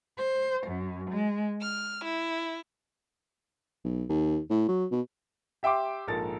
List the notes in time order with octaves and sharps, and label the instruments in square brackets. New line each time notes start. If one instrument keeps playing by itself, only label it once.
[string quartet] C5
F#2
G#3
F6
E4
[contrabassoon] B1
D#2
A2
F#3
B2
[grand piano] G4 E5 G5 C6 D6
A#1 G#2 A4 A#4 A6